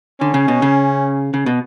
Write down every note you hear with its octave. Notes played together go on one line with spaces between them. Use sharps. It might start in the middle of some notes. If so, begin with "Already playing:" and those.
D3 C#4
C#3
B2
C#3
C#3
B2